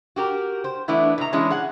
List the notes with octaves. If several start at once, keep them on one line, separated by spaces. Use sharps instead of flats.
F#4 G4 A#4
C5
E3 A3 B3 D4 E4
B2 A#5
E3 G#3 C#4 D4 E4
G#4 F#5